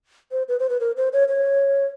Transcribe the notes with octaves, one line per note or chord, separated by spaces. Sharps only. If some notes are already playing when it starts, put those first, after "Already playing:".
C5
B4
C5
B4
A#4
C5
C#5
C#5